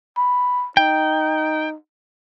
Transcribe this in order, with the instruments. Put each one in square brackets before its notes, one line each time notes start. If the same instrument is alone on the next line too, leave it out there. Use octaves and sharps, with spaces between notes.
[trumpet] B5
[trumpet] D#4 [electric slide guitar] G5